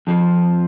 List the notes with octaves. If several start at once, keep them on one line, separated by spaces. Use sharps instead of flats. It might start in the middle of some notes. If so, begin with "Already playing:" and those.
F2 F3